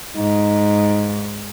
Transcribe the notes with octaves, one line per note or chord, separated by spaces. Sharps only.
G#2 D#4